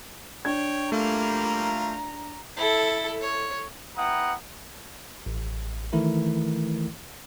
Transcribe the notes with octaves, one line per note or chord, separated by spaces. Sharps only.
D4 C#5 G5 G#6
G3 A3 A#3 F4 A#5
E4 A4
C#5
B3 E4 F#5 G5 A#5 D#6
A1
D#3 E3 A3 E4 A#4